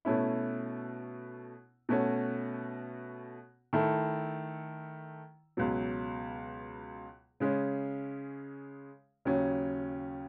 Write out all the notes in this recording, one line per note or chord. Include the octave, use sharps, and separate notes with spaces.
B2 A3 C#4 E4
B2 A3 C#4 F#4
D#3 A3 E4 A4
C#2 B2 F#3
C#3 G#3 C#4
D#2 C#3 F#3 C#4